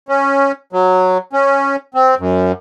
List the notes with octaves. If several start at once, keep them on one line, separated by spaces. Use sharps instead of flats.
C#4
F#3
C#4
C4
F#2